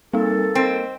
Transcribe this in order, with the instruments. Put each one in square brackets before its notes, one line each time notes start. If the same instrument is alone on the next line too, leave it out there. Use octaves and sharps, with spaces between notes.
[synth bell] G3 C4 D#4 [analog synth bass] A#3 [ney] A4
[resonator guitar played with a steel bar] C4 [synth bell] A#4 D#5